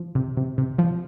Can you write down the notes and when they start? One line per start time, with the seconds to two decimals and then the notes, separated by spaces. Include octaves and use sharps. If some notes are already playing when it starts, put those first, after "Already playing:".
Already playing: F3
0.15 C3
0.37 C3
0.58 C3
0.78 F3